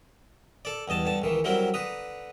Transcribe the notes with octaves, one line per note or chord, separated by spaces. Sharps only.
A4 D5
E2 G2 D#5 A5
G2 D3 A5
C#2 D#3 E3
D3 F#3 G3 C4 E4 A#4
D3 B4 A#5 D#6